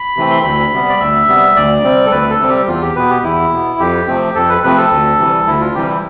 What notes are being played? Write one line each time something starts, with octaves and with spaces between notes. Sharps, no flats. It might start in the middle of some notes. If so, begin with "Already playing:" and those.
Already playing: B5
C3 E3 A3 C4
C6
D2 B5
C3 G3 B3
D5
D2 E5
C3 G3 B3
D2 D5
C3 G3 C4
A4
D2 B4
A4
C3 G3 C4
G4
E2 F4
G4
B2 B3 B4
G4
E2 E4
B2 B3
F2 G4
C3 F3 A3 C4
F2 A4
B4
C3 F3 A3 C4 B4
A4
D2
C3 E3 G3
D2 E4
F4
C3 E3 G3 G4
E4